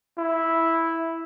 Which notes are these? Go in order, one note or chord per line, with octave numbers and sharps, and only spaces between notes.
E4